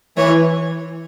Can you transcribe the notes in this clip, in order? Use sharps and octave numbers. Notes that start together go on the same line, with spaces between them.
E3 C#5